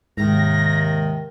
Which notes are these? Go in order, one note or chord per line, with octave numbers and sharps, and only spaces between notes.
D#2 G#2 C3 D#3 A#6